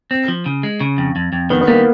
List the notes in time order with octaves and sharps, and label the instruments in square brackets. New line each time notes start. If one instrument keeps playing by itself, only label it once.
[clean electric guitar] C4
F3
C#3
G#3
C#3
F2
F2
F2
[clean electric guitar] D#3 [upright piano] B3
[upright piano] B3
[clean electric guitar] G3 [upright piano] A#3